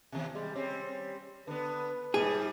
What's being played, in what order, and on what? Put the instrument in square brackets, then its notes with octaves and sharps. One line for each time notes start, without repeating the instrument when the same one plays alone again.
[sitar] D#2 C3
[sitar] G3 [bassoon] G#3
[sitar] G3 C4 [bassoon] C#4
[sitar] D3 B3 [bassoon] B4
[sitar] G#2 G3 [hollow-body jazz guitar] G#4